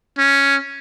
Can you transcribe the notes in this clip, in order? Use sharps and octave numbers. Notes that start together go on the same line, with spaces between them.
C#4